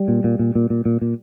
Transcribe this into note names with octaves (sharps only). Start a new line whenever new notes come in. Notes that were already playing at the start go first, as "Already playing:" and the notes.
Already playing: G3
A#2
A#2
A#2
A#2
A#2
A#2
A#2